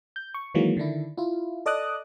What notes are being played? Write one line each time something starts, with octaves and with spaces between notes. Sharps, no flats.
G6
C#6
D#3 E3 F#3 G#3 A#3
D3 D#3 D4 E4
E4 F4
A4 D5 D#5 D6 D#6 F#6